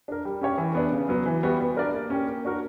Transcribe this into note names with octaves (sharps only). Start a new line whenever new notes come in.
D4 A#4
G3
C#4 G4 C#5
E3
B3 D4
C#3
F#3 B3
E3
G3 B3 F#4
B3
D4 A#4 D5
A#3
C#4 G4 A#4
A#3
D4 F#4 A#4